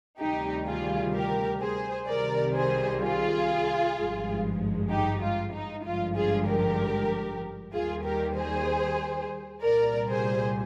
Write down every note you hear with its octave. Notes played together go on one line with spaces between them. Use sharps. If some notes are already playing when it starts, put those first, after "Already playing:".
D2 C3 D#3 G3 D#4 G4
F4 G#4
G4 A#4
G#4 C5
C2 C3 D#3 G3 A#4 D5
G#4 C5
F4 G#4
G#1 G2 F3 G#3
D#4 G4
F4
D#4
G#1 G2 D3 F3 G#3 F4
F4 G#4
G4 A#4
D#2 D#3 G3 F4 G#4
G4 A#4
G#4 C5
C2 A#2 G3 A#4 D5
G#4 C5